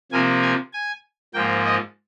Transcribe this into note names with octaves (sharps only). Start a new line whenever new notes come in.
C3 F3 A#3 G#5
G#5
G#5
G#2 F3 A#3 G5
D#5